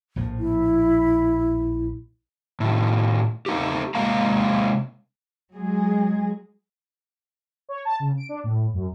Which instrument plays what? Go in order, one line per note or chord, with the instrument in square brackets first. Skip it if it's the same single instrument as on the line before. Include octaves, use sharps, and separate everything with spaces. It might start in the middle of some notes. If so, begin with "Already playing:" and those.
[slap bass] A#1 A2 F3
[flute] E4
[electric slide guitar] A2 D#3
A3 D#4 G4
C3 G#3 A#3 F5 A#5
[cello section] F#3 G#3 G#4
[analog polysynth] C#5
A5
C#3
D7
D4
A2
F#2